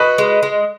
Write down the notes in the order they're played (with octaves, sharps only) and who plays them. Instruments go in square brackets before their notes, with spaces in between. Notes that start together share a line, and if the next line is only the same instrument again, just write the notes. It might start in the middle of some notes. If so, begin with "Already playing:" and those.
Already playing: [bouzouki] F#4 [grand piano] B4 D#5
[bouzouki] G#3
G#3